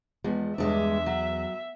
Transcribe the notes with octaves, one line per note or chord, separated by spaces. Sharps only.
E2 F3 G#3
E2 G2 G#3 D4 E5
F#3